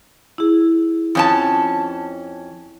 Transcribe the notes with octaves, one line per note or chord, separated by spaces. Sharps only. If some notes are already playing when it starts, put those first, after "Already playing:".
E4 G#4
F2 C#4 A5